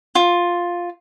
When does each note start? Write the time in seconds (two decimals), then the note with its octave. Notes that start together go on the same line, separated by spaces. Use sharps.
0.15 F4